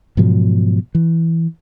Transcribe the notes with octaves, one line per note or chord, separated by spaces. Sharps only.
G#2 B2 F3 F#3
E3